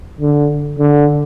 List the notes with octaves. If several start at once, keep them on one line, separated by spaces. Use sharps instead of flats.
D3
D3